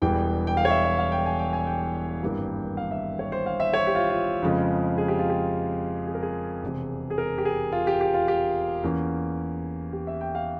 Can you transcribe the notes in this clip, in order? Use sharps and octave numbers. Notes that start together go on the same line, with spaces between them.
E1 E2 E3 G3 G5
G5
F5
C#5
E5
E5
F5
G5
G#5
G5
G#5
G5
G#1 G2 E3 G3 A#3
F5
E5
C#5
C5
F5
E5
C#5
G4
F4
F4
F2 C#3 F3 G#3
G#4
G4
F4
G4
G#4
A#4
G#4
E1 E2 C3
G#4
A#4
G4
G#4
F4
G4
G4
F4
G4
E2 E3 A#3 C#4
G4
E5
G5
F5